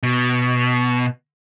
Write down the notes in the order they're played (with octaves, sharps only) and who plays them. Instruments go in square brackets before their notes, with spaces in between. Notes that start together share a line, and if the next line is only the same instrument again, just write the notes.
[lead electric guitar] B2